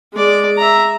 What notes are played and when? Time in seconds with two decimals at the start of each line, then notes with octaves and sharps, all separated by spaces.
0.13 G#3 D5
0.58 E5 A#5